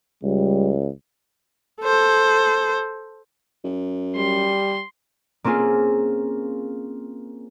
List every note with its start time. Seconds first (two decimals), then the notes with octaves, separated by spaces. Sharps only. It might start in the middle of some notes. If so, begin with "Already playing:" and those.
0.23 C#2 G3
1.82 A4 C5
3.64 F#2
4.16 G3 C6
5.44 A#3 C4 C#4 F4 G#4